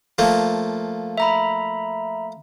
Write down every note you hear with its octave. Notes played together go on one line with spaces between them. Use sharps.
F3 A3 A#3
E5 A#5 B5